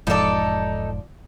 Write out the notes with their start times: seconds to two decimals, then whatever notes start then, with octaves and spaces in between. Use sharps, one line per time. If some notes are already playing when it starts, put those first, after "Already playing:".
0.07 E1 G#2 F3 D#4 A4 D5